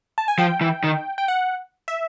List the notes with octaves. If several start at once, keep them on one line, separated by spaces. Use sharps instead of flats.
A5
G#5
F3 G5
E3
D#3
G5
F#5
E5